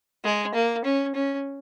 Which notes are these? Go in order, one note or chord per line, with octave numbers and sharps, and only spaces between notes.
G#3
A#3
C#4
C#4